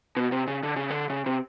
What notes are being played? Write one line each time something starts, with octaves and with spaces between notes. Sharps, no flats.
B2
C3
C#3
D3
C#3
D3
C#3
C3